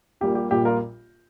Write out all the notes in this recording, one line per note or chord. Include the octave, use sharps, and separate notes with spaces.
A#1 A#2 G3 A#3 G4
G4
A#1 A#2 G3 A#3 G4
F4 A#4